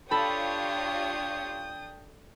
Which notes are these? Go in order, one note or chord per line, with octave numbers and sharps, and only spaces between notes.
D4 F4 G4 A4 C#5 G5 B5 D#6